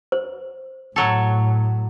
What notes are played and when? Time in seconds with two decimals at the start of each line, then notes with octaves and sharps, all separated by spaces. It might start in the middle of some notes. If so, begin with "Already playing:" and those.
0.12 C5
0.96 A2 F#3 A4